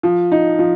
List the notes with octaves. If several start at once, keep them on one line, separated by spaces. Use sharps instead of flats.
F3
D#4
F3